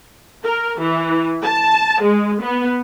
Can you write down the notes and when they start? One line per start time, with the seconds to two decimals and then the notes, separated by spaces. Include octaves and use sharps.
0.45 A#4
0.81 E3
1.43 A5
2.02 G#3
2.42 B3